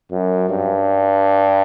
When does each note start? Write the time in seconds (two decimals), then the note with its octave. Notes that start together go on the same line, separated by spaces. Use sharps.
0.12 F#2
0.49 G2